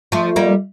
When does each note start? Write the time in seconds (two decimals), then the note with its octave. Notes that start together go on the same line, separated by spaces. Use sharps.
0.12 F3 A3
0.36 G3 A#3